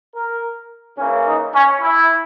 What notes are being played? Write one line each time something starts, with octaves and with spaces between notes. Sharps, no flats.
A#4
C#3 E3 A#3 C#4
D#4
C#4
E4